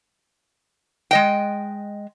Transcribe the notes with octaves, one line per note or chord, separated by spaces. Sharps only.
G#3 D#5 G5